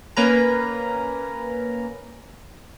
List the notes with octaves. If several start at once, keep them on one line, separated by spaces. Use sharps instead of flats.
A#3 C#4 B4 A#5